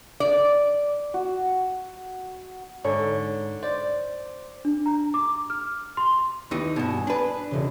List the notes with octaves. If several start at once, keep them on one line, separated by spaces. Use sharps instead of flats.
D5
F#4
G#2 D3 C#5
C5 D5
D4
A#5
D6
F6
C6
D#2 E3 D#4
G2 B2 G#5 D#6 E7
D4 B4
E1 C#3